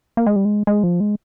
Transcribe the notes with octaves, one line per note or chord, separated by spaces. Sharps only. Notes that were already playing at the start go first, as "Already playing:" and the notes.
A#3
G#3
G3
G#3
G#3
F3
G#3